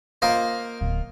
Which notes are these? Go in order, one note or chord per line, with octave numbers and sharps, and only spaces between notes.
A#3 F4 A#4 C5 D#5 F5
D1